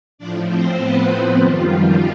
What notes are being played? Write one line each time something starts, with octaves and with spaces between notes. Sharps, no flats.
A2 F3 D4 D5
C4 C5
B3 B4
F#2 D#3 F3 G3 F4